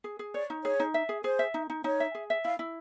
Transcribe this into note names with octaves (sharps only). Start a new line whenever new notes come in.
G#4
G#4
C#5 D5
D#4
G#4 C#5
D#4
E5
G#4
G#4 C5
E5
D#4
D#4
D#4 C#5
E5
G#4
E5
E4 F5
E4